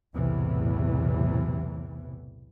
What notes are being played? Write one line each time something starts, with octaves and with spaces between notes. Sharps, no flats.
B1 E2 A2 C3 E3